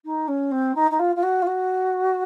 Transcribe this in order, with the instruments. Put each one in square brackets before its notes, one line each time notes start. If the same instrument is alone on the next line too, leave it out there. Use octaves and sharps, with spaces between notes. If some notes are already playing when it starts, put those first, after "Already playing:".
[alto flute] D#4
C#4
C4
D#4
D#4
F4
F4
F#4
F4
F#4